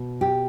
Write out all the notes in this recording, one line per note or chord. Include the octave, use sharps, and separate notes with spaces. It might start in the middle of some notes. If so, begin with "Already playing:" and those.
Already playing: B2
G4